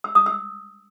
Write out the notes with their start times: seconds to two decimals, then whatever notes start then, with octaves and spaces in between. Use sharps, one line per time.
0.04 E6
0.15 D#6
0.26 E6